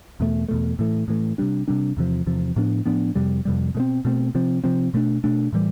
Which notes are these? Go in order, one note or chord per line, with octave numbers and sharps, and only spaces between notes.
E2 B2 A3
E2 B2 A3
A2 E3 A3
A2 E3 A3
C3 G3 D4
C3 G3 D4
E2 C3 F3
E2 C3 F3
A2 F3 B3 D4
A2 F3 B3 D4
F2 C3 G3
F2 C3 G3
B2 A3 C4
B2 A3 C4
C3 F3 C4
C3 F3 C4
B2 A3 D4
B2 A3 D4
A2 E3 G3